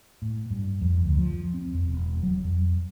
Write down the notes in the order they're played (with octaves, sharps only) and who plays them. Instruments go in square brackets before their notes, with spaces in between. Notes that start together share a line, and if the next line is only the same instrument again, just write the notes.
[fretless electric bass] A2
G2
F2
D2
F3
C4
F2
E1
F#3
F2